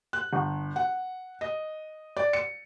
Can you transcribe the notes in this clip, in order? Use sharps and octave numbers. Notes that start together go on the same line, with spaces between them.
F#6
G1
F#5
D#5
D5
C#7